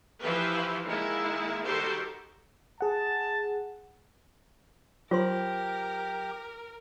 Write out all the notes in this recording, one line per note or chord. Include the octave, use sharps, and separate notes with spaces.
E3 F3 E4 G4 B4 C5
D#3 G#3 A#3 E4
D#3 G3 F#4 G4 A4 C5
G#4 F#5 A5
F#3 F4 G4 A#4 C5 C6